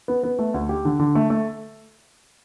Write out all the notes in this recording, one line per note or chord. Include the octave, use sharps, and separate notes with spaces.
B3
B3
A3
D2
G4
D3
D3
A3
A3